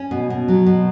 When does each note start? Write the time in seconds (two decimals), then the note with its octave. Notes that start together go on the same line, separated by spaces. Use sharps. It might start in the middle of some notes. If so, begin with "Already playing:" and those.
Already playing: C#4
0.11 B2
0.30 B2
0.48 F#3
0.66 B2